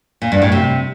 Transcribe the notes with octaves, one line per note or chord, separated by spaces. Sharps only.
A#2
G2
A2
C3